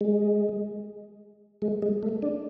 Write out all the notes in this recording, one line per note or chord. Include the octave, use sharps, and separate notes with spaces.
G#3
G#3
G#3
A3
D4